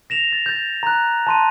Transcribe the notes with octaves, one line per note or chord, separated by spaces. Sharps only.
A#6 E7 F7
A6
G6 A6
A#5 F#6
A5 C6 D#7